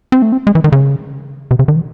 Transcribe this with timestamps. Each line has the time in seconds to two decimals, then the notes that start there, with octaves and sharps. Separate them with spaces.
0.12 C4
0.22 A3
0.32 C4
0.47 G#3
0.55 E3
0.64 D#3
0.72 C#3
1.51 C3
1.59 C#3
1.68 D#3
1.76 E3